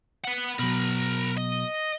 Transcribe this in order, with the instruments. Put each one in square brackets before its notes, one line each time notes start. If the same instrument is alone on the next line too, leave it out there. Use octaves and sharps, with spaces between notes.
[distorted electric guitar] B4 F#5
[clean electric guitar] B2 F#3 [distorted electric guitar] A#4 B5
[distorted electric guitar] D#5